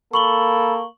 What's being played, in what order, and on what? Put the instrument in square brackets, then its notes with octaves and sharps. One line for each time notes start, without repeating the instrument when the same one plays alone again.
[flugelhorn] A#3 [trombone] A4 [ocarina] B5 [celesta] C#6 F#7 G7